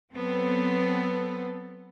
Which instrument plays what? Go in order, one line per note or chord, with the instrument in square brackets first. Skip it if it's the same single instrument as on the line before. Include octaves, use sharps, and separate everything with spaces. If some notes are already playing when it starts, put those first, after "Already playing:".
[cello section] F#3 B3 C4 A4